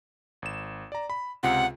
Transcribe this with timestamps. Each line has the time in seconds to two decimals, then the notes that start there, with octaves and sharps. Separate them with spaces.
0.42 G#1 E7
0.92 D5 A#5
1.10 B5
1.43 C#2 C3 F4 F#5